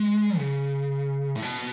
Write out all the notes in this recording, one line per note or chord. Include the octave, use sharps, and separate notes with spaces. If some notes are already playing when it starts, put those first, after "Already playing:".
Already playing: G#3
C#3
A2
B2